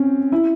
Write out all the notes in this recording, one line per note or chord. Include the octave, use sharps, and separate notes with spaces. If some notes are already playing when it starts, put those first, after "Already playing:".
Already playing: C4 C#4
E4